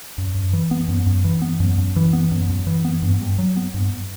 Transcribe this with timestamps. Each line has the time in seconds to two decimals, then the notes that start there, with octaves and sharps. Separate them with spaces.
0.18 F#2
0.35 F#2
0.53 E3
0.71 B3
0.88 F#2
1.06 F#2
1.24 E3
1.42 B3
1.60 F#2
1.78 F#2
1.96 E3
2.13 B3
2.31 F#2
2.49 F#2
2.67 E3
2.85 B3
3.02 G2
3.21 G2
3.38 F#3
3.57 B3
3.74 G2